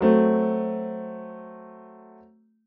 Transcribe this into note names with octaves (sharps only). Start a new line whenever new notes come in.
F#3 A3 C4